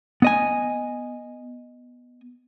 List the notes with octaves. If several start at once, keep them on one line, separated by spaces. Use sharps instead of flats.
B3 D#5 G#5